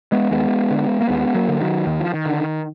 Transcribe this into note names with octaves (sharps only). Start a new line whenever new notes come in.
G#3 B3
D#2 G#3 B3
D3
A#3
D#2 G#3 B3
F#3 A#3
D3
D#3 F#3
D#2 D#3
F3
D#3
D3